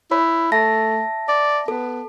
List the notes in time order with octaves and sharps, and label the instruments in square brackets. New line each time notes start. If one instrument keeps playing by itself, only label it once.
[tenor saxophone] E4 [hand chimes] C#5 B5
[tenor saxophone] A3 [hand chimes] E5 A5 A#6
[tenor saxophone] D5
[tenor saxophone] B3 [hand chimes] A4